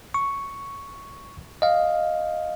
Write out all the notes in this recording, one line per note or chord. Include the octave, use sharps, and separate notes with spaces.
C#6
D#5 F5